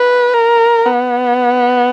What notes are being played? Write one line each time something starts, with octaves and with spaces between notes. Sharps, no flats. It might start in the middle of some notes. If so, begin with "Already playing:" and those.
Already playing: B4
A#4
B3